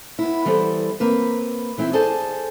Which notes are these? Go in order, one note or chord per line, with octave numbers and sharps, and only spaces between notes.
B3 E4
E3 G3 B3 A4 C5
A#3 C4 B4
E3 C4 E4
G#4 A4 C5 D5 G#5 A5